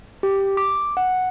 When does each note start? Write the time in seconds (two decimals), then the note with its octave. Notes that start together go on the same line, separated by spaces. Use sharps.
0.23 G4
0.57 D6
0.97 F#5